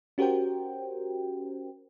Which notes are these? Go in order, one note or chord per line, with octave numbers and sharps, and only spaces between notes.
C#4 F#4 G4 A#4 C5 G5